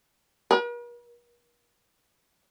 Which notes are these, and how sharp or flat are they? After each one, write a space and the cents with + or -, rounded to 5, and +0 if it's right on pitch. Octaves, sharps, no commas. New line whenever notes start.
A#4 +45